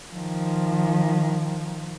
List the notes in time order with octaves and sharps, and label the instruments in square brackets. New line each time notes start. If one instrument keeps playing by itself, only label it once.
[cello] D#3 F3